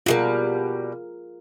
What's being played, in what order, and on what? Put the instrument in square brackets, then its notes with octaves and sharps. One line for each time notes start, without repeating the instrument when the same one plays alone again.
[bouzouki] B2 D#3 G3 [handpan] F4 G#4 A#4